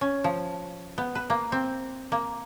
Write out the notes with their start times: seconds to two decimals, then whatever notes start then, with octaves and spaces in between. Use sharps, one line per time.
0.01 C#4
0.24 F3
0.98 B3
1.15 B4
1.30 A#3
1.52 C4
2.12 A#3